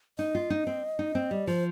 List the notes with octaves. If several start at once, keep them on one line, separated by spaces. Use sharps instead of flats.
D#4 D#5
F4
D#4
C4
D#4
C4
G3
F3 C5